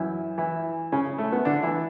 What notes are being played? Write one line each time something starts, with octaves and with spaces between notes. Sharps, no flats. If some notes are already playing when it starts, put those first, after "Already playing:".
Already playing: F#2 E3 E4
E3 E4
C#3 C#4
A3
B3
D3 D4
E3 E4